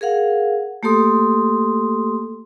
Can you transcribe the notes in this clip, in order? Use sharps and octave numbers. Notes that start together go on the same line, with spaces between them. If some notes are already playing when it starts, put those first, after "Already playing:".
G#4 A#4 F5 F#5
A3 A#3 G4 A4 C6 D#6